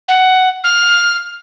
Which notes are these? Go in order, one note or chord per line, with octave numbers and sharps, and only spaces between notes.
F#5
F6